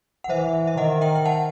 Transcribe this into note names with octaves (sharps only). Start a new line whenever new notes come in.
F#5
E3 C5 E5
E5
D#3 D#5 F#5
E5 G5
G5
F#5 A5